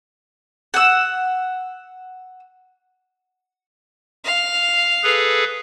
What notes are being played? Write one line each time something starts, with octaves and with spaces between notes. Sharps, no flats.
F#5 E6
F5
G#4 A4 B4